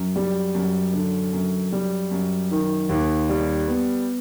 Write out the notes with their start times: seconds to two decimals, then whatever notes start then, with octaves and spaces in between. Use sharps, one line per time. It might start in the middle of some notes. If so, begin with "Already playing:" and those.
Already playing: F#2
0.16 G3
0.55 F#2
0.93 D3
1.33 F#2
1.72 G3
2.11 F#2
2.51 D#3
2.89 D#2
3.29 G3
3.68 B3